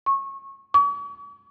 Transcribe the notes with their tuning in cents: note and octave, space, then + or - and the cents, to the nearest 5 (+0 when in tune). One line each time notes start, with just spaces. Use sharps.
C#6 -25
C#6 +45